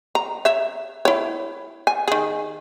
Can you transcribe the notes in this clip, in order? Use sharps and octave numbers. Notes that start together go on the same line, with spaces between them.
A#5
C#5 E5
E4 C#5
G#5
D#3 G#4